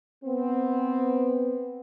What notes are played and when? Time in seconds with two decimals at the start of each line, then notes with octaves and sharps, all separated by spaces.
0.25 B3 C4